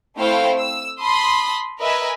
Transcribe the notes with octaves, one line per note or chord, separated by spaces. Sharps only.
A3 C4 E4 C5 F5 G5
E6
A5 B5 C6 D#6
A#4 B4 D#5 E5 G#5